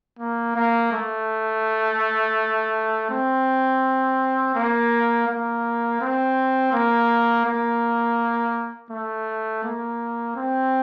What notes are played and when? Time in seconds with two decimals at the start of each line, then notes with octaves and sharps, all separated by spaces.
0.19 A#3
0.56 A#3
0.93 A3
3.10 C4
4.55 A#3
5.28 A#3
6.01 C4
6.73 A#3
7.45 A#3
8.90 A3
9.64 A#3
10.36 C4